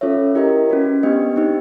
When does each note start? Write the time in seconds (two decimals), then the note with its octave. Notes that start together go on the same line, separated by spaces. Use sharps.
0.01 C#4 F4 A4 C#5 E5
0.35 E4 G4 A#4 D#5
0.70 C#4 F#4 B4
1.03 B3 D4 G4 B4 D#5
1.36 C4 D#4 G4